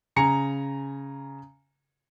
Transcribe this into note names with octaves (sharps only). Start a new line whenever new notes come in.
C#3 G#5 A#5 C#7